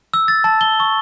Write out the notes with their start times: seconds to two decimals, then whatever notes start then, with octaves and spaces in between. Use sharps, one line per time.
0.14 E6
0.28 A6
0.44 A5
0.61 G7
0.80 C#6